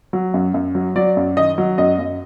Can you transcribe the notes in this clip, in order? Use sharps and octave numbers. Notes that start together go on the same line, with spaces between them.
F#3
F#2
F#2
F#3
F#3 D5
F#2
D#3 D#5
F#3
F#2 D#5
F#2